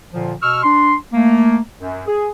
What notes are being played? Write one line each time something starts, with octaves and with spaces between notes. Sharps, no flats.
A#2 D3 F3
B2 C#6 E6 F6
D4 C6
A3 A#3
F#2
G#4